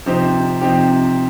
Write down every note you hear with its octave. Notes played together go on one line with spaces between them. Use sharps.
C3 F3 C4 D#4 G4
C3 F3 C4 D#4 G4